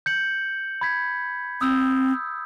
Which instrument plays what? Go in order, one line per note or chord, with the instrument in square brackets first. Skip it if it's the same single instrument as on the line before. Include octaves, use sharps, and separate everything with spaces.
[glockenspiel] G6 C#7 F#7
B5 G#6 B6
[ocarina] C4 [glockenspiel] D#6 E6 G6